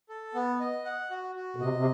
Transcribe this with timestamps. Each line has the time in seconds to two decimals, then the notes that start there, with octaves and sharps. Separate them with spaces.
0.09 A4
0.34 B3
0.60 D#5
0.85 F#5
1.10 F#4
1.35 F#4
1.56 B2
1.61 C3 D#5
1.76 C3